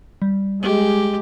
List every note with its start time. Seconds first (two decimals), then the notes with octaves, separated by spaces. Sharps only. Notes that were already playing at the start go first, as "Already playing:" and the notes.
0.22 G3
0.62 G#3 G4